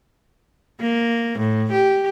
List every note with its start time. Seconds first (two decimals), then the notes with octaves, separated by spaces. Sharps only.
0.80 A#3
1.39 A2
1.72 G4